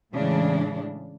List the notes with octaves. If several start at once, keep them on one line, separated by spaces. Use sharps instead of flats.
A2 C#3 E3 G#3 D4